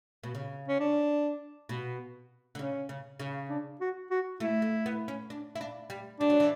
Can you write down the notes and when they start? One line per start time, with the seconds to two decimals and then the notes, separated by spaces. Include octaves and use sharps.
0.23 B2
0.35 C#3
0.69 C#4
0.80 D4
1.69 B2
2.55 D3
2.59 C#3 C#4
2.89 C#3
3.20 C#3
3.50 D4
3.81 F#4
4.11 F#4
4.40 A3 E4
4.62 A3
4.86 B3
5.08 C#4
5.30 D4
5.55 E4
5.61 D4
5.90 G3
6.20 G3 D4
6.30 F#3
6.40 E3